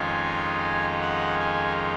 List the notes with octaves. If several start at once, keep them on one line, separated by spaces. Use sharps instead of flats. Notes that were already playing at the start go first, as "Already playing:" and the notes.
Already playing: F2 D#3 G#3 C#4 F4 G#5
F#5
G#5